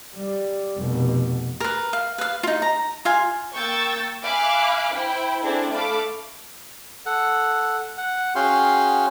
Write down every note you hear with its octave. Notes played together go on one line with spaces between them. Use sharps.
G3
F1 B2
A#4 B4
F5
B4 F5
D#4 F4
A#5
F4 F5 G#5
A#3 G5 C#6 E6 G6 A6
E5 F5 G#5 B5 D6 F#6
E4 C5 G5 B5
C4 D4 E4 G#4 A4 C5
A3 A4 F5 B5 D6
A4 F#5
F#5
C#4 F#4 G#4 F5 G5 C6